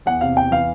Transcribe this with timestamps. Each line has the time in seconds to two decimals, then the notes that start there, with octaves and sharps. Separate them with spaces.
0.06 E2 F#5
0.21 C3 F5
0.37 E2 G5
0.51 E3 F5